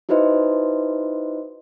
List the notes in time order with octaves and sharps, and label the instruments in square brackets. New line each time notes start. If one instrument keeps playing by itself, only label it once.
[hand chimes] D#4 E4 F#4 B4 C5 D#5